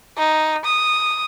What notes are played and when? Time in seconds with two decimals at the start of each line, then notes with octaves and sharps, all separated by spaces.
0.18 D#4
0.65 D#6